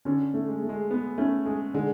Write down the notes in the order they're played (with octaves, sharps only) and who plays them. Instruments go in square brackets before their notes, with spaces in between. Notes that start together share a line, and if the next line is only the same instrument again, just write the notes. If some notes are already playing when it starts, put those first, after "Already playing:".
[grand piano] D3 [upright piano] C#4
[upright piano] A3
[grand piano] G#3
[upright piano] A3
[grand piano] G#3
[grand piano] B3 [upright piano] G#4
[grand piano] A3 [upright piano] C#4
[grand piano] G#3 [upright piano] G#4
[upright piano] D3 [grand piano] G#3